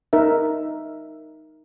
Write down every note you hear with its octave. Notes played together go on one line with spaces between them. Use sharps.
D#4 A#4 E5